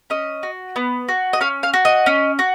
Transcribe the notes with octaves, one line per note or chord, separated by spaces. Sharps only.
C#4 D#5
F#4
B3
F#4
D#5
C#4 F5
F5
F#4
D#5
C#4
F#4